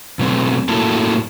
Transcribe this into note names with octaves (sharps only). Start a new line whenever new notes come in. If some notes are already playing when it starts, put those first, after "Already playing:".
B2 F#3 A3 C4
A2 F#3 A#3 E4 A4